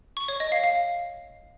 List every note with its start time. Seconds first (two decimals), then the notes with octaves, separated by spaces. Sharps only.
0.17 C#6
0.28 C#5
0.40 D#5
0.52 F5
0.64 F5